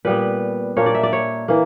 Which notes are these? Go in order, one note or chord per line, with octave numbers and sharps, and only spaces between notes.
A#2 G3 B3 B4
A#2 A#3 D4 C#5
D5
E5
D5
C#5
E3 A#3